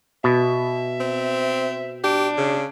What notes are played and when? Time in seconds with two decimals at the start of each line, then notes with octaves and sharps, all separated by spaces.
0.24 B2 E5
1.00 C4
2.04 D4 G4
2.38 C#3